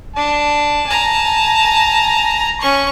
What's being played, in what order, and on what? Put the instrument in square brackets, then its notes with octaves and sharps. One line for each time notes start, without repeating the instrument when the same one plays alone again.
[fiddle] D4 [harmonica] A5
[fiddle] G#5 A#5
C#4 C#6